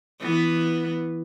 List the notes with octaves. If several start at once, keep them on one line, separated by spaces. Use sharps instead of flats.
E3 B3